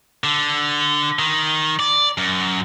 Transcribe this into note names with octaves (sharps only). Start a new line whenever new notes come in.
D3
D#3
D5
F#2